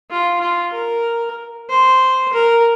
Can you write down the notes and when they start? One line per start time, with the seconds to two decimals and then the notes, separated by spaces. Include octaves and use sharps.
0.10 F4
0.41 F4
0.73 A#4
1.70 C5
2.33 A#4